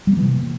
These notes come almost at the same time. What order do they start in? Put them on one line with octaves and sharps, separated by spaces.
G3 A#3 E3 C3